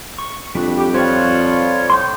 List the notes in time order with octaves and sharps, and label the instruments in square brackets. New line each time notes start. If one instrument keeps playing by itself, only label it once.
[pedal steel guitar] C#6
[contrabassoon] F2 [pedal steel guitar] G3 D4 F#4
[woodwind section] G4
[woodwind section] F3 G3 [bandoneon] F4 C#5 [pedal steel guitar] F#4 C#6
[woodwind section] A2 [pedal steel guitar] C6 C#6 G6